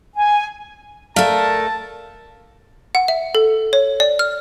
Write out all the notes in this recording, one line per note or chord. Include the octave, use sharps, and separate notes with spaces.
G#5
A3 A#4 D5 F5 A5 F6
F#5
E5
A4
C#5
D5
F6